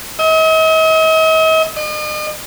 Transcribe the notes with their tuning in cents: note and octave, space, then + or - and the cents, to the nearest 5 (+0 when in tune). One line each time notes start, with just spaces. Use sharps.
D#5 +45
D#5 -40